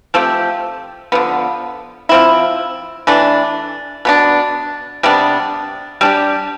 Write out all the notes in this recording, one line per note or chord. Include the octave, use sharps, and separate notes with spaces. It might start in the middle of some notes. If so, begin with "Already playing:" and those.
F3 A3 C4 G4
D3 F3 B3
F3 C4 E4
E3 A3 D4
B2 B3 D4
C3 G3 B3 D4
G3 D4 G4